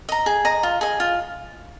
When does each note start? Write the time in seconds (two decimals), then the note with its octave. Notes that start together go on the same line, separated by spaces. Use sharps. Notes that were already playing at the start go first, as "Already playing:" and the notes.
0.09 D#5 A#5
0.26 G#4
0.45 D#5 A#5
0.63 F4
0.81 G#4 D#5
1.00 F4